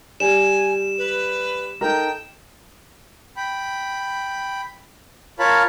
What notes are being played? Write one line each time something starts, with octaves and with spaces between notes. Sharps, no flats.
G3 G#5 E7
B4
D#4 A4 A#4 G5
G5 B5
F4 A#4 C#5 F5 A5 B5